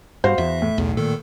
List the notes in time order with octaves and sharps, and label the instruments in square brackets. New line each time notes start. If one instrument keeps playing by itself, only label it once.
[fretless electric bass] G2 [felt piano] F#4 C5 F5
[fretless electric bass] E2 [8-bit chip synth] E5
[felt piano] A2
[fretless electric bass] B1 [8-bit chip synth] E2
[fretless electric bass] A#2 [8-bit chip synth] D#3 A4